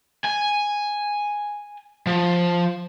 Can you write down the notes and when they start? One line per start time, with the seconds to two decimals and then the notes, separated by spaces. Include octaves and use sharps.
0.25 G#5
2.07 F3